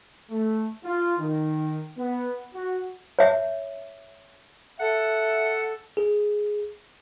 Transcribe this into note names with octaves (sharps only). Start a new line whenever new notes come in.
A3
F4
D#3
B3
F#4
C#5 E5
A4 E5 F#5
G#4